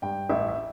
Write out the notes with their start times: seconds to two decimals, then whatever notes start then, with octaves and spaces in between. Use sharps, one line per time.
0.02 G2 G5
0.30 A1 E5
0.48 E5